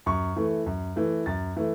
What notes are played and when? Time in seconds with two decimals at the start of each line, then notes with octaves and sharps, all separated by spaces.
0.06 F#2 C#6
0.36 E3 A3
0.66 F#2
0.96 E3 A3
1.26 F#2 A6
1.56 E3 A3